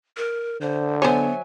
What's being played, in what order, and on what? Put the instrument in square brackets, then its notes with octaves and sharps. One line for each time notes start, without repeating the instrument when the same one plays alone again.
[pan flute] A#4
[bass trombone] D3 [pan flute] C5
[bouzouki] F#3 E5 G#5 [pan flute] B3 [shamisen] C5 C#5